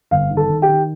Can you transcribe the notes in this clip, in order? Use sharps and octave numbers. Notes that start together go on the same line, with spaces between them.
G1 F5
D#3
A4 A5
D#3
G4 G5
D#3